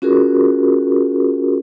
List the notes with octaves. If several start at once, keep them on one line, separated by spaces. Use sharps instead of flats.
C#4 F4 F#4 G#4 A#4